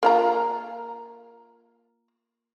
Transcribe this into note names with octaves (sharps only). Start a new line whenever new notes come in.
A#3 F4 A#5